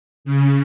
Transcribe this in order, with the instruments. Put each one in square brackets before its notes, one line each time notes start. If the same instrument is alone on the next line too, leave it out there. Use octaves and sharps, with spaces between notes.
[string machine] C#3